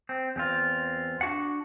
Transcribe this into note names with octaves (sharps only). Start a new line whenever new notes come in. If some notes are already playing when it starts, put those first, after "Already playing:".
C4
E2 C4 F4
D4 F#4 F#5